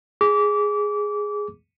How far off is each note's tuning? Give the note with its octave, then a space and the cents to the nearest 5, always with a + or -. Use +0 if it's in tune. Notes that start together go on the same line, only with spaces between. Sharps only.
G#4 +0 D6 -25